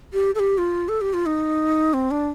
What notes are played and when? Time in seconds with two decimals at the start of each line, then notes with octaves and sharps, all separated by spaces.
0.13 G4
0.35 A4
0.39 G4
0.58 F4
0.89 A4
1.01 G4
1.14 F4
1.26 D#4
1.94 C4
2.11 D4